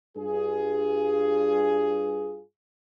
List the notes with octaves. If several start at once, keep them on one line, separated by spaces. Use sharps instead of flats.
G2 F4 G#4